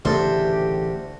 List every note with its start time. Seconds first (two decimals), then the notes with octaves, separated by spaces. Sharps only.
0.05 A1 D2 C#3 A3 G4 A4 C5 E5